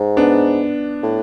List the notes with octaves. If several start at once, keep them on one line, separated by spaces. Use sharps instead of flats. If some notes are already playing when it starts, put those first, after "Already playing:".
Already playing: G#2
B3 D4
A2